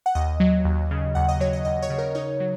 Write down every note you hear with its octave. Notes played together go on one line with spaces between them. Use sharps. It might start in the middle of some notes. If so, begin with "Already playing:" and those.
F#5
D#2 D#5
F#3
D#2
C#3
D#2 F#5
D#5
F#3 C#5
D#5
D#2 D#5
C#5
C#3
A#4
D#4 C#5
F#3